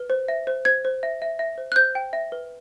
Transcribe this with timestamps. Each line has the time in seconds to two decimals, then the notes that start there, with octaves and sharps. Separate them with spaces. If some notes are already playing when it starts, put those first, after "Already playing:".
Already playing: B4
0.10 C5
0.28 E5
0.47 C5
0.65 C5 G#6
0.85 C5
1.03 E5
1.22 E5
1.39 E5
1.58 C5
1.72 F#6
1.76 C5 G6
1.95 G5
2.13 E5
2.32 B4